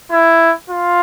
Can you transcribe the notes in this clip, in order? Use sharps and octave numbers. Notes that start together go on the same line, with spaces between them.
E4
F4